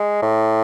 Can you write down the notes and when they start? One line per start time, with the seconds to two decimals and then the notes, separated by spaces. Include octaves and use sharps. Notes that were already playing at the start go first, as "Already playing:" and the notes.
Already playing: G#3
0.23 A2